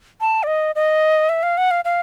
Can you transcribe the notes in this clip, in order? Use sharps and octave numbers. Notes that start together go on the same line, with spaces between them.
A5
D5
D#5
D#5
E5
F5
F#5
F5
F5